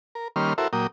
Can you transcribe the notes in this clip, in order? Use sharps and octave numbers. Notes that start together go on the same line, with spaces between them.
A#4
D#3 G3 A#3 C#4 C6 F6
E4 F#4 A4 A#4 C5 E5
A#2 F#3 A#3 G5 D#6